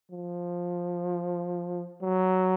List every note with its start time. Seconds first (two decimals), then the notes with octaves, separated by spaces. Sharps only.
0.11 F3
2.03 F#3